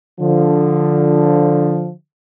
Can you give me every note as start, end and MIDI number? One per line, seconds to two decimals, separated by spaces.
0.20 1.92 50
0.20 1.92 53